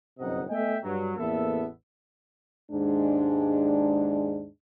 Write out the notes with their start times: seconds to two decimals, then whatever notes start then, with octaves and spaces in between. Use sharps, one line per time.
0.19 G1 F#2 C3 D#4 D#5 F#5
0.50 A3 B3 D#5 E5 G5 G#5
0.84 G2 F#3
1.17 A1 E2 A#3 B3 A4 E5
2.72 D#2 G#2 G#3 D4